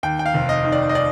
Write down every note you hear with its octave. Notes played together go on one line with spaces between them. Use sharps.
D#2 G5
G5
F5
F1
D#5
D#3
D5
D#5
D5